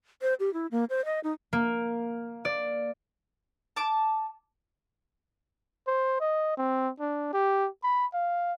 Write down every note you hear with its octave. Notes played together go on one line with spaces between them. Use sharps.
C5
G4
E4
A#3
C5
D#5
D#4
A#3
D5
A5 D6
C5
D#5
C4
D4
G4
B5
F5